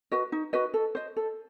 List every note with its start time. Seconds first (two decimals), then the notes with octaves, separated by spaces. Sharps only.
0.12 F#4 B4 D#5
0.32 D#4
0.53 F#4 B4 D#5
0.74 A4
0.95 C5 D#5
1.16 A4